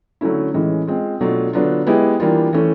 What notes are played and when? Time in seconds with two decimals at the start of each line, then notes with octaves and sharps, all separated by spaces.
0.21 D3 F#3 A3 C#4 E4
0.54 A2 E3 G#3 C#4
0.87 G#3 C4 F4
1.20 B2 F#3 A3 D4 F4
1.53 D3 F#3 B3 D4 F4
1.87 G#3 B3 E4 G4
2.20 E3 G3 A#3 D4 F4
2.53 E3 A3 C#4